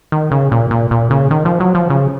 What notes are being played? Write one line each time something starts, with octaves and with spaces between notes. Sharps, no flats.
D#3
C#3
A#2
A#2
A#2
C#3
D#3
F3
F#3
F3
C#3